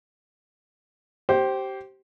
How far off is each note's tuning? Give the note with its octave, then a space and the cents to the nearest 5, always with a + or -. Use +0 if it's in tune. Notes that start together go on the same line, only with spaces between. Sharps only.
G4 -20 C5 +10